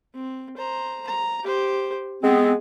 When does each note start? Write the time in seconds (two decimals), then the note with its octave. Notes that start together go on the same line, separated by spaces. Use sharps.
0.14 C4
0.57 C5 A#5
1.07 A#5
1.44 G4 C5
2.23 G#3 B3 C4 G#4